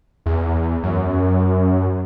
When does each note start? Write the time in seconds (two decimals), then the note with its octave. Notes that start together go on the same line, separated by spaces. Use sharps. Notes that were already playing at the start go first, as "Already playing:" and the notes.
0.26 E2
0.83 F#2